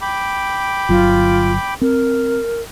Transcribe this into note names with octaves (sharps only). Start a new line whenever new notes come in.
G5 B5 D6
G1 F#3 F4
C4 A#4